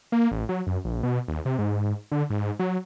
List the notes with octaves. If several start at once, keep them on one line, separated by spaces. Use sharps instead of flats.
A#3
A1
F#3
F#2
A#1
B2
D#2
C3
G#2
D3
G#2
F#3